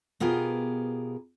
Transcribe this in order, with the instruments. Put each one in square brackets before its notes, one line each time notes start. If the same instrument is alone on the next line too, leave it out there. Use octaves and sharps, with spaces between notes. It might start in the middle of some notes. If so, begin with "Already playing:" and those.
[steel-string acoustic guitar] B2 B3 F4 G4 G#4 A#4